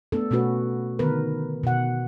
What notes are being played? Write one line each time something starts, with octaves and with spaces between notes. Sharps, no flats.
A3 B3 D4 A4
B2 A3 C#4 F#4 B4
D3 D#3 B3 A#4 B4
B2 F#5